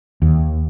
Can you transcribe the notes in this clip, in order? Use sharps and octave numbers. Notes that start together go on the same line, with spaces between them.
D#2